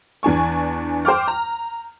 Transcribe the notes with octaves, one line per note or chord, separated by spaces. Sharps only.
E2 D4 G#5 C#6
C5 G5 D6 F6
A#5